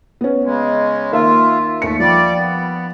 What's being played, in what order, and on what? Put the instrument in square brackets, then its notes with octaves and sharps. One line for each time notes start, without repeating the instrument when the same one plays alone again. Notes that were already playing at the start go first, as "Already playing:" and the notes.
[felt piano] B3 C#4
[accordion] C#3 G#3
[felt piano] D#3 A#3 E5 [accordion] F4
[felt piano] D#2 C#7 [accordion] A3
[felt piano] F3 [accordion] G3 D5
[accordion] B3